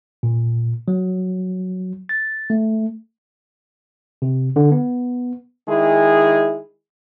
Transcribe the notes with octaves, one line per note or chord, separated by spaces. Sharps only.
A#2
F#3
A6
A3
C3
D3
B3
D#3 G#3 E4 G#4